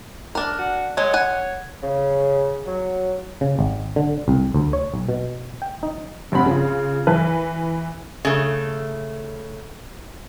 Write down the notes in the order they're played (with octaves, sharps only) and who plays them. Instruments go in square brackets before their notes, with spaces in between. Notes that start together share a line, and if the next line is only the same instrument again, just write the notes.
[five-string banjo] D4 A#4
[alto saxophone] F#4
[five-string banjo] F#3 G#3 [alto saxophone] C#5
[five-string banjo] F#5 G#5
[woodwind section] C#3
F#3
[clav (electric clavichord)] C#3
G#1
D3
C2
D2
C#5
B1
B2
G5
D#4
[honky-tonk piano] F1 G2 C4 F#5 B5
C#3 F4
E3 B4
[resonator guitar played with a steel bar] C#3 A3